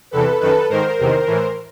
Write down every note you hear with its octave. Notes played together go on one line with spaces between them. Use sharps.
E2 C3 E3 A4 B4
F#2 D#3 A4 B4
G#2 D#3 A#4 C5
E2 C3 D#3
A2 E3